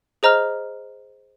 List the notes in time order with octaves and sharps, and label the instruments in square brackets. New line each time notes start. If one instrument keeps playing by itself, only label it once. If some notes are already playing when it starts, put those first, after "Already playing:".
[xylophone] G#4 C5 D#5 A#5 F6